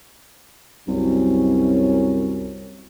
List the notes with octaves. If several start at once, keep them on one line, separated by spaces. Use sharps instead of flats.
C2 F#2 C#4